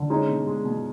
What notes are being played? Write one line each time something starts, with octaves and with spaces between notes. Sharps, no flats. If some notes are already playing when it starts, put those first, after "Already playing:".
Already playing: D3
G#3 C#4 D#4
B2
G#3
B2